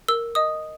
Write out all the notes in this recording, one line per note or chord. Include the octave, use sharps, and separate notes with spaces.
A#4 E6
D#5 D#6